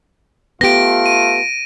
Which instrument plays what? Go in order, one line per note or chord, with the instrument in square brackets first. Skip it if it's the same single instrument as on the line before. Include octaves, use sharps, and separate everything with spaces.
[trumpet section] A3 F4 [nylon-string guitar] B3 G4 [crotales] A#6 D7
[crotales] D#7